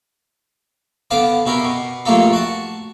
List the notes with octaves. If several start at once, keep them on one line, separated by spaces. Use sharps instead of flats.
D3 B3 F5 A5 D6
B2 E4 G4 A#4
B2
A#1 G2 A3 A#3 F4 A4
F#4 A5